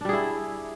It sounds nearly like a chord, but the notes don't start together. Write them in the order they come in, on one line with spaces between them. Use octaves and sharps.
D4 G3 G#4 E4